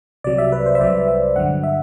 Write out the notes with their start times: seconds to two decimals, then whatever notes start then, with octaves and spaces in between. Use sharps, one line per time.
0.24 C2 C3 F#3 D5
0.38 E5
0.52 B4
0.66 C5
0.75 E5
0.80 C2 C3 F#3 D5
1.08 E5
1.36 G2 D3 F#3 F#5
1.63 E5